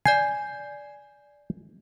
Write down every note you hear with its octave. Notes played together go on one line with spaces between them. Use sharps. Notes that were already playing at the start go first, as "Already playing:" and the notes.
D5 G#5 G6 C7